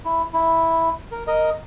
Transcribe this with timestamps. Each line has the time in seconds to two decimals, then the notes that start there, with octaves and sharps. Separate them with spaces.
0.05 E4
0.33 E4
1.12 A#4
1.27 A#4 D#5